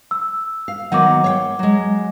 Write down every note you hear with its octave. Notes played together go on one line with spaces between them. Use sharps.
E6
F5
D#3 F#3 B3 F#5 D6
C#5 F5 G5
F#3 G#3